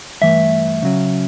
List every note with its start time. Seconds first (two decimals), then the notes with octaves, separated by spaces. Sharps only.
0.21 G2 E3 A3 E5
0.82 C#3 F#3 C#4